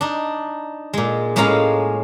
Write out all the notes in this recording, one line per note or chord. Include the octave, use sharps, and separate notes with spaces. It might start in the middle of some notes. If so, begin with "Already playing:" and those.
D4 D#4
A#2 G#3
A2 G#3 A#3 C#4 F5 A#5